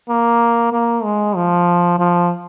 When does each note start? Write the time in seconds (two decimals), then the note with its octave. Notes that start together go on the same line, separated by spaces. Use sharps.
0.08 A#3
0.72 A#3
1.04 G#3
1.36 F3
1.99 F3